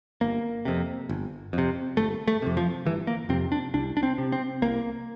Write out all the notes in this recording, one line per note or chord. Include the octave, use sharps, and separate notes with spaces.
G1 A#3
F2 C3
G1
F2
C3
G1 A3
A3
F2 C3
F3
G1 E3
A#3
F2 C3 C4
D4
C2 D4
D4
C4
C3
C4
C2 A#3